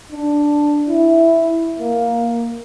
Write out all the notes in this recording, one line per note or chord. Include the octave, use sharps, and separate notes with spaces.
D4
E4
A#3